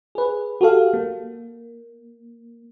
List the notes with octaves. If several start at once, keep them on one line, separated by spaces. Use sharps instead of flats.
G#4 B4
F#4 G4 A4 F5
A#3